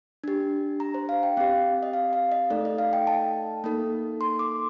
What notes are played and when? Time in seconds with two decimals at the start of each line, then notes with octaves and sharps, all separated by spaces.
0.24 D4 G4
0.80 A#5
0.94 C5
1.09 F5
1.23 G5
1.37 C4 G4 F5
1.83 D#5
1.93 F5
2.13 F5
2.32 D#5
2.50 A3 D#4 A4 D5
2.65 D#5
2.78 F5
2.93 G5
3.07 A5
3.64 A#3 D#4 A4
4.21 C6
4.39 D6